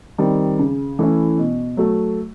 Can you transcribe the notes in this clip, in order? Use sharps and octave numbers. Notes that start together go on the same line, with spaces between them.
D#3 G3 C4
C#3
E3 A3 C#4 E4
B2
F#3 A3